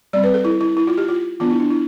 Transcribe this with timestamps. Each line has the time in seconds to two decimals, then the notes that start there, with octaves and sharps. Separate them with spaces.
0.13 G3 C4 D5
0.24 B4
0.34 A4
0.45 E4
0.61 E4
0.77 E4
0.87 F4
0.98 G4
1.08 F4
1.40 E3 B3 D4 F4
1.50 E4
1.60 D4
1.70 E4